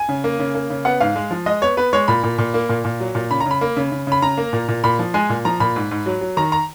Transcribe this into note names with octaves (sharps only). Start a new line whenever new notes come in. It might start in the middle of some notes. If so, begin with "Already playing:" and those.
Already playing: G#5
C#3
A#3
C#3
A#3
C#3
B3 F#5
G#2 F5
G#3
F3
G#3 D#5
B3 C#5
B3 B4
G#3 C#5
A#2 B5
A#2
A#2
A#3
A#2
A#2
F#3
A#2
C#3 B5
A#5
C#3 B5
A#3
C#3
C#3
C#3 B5
C#3 A#5
A#3
A#2
A#2
A#2 B5
F3
G#3 G#5
A#2
F3 A#5
A#2 B5
G#2
G#2
F#3
F#3
D#3 A#5
A#5